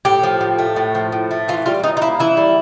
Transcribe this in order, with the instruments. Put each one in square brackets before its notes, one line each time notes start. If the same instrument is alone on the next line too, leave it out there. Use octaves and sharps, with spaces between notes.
[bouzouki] A2 G4
F3
A2
A3
A2
F3
A2
A3
E3 F4
G3 F4
E3 D#4
D#4
A#3 E4
E3 E4
G3